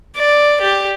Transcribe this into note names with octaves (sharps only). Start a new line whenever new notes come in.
D5
G4